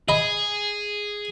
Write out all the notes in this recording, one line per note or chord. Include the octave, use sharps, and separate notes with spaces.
G#4 D#5 B5